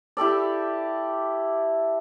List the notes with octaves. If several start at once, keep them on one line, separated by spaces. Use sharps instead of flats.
E4 G4 A4 D5